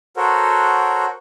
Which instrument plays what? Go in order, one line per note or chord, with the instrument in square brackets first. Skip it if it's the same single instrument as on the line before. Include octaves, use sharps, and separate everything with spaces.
[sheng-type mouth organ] F#4 A4 A#4 C5 C#5 F#5